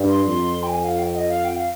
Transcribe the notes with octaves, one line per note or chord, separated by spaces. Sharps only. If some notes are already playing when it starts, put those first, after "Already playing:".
Already playing: G2
C6
F2
G5
G#5
F5
G5
D#5
F5
G5
F5